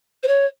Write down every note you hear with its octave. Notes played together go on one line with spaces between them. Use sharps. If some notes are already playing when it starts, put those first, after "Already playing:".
C5
C#5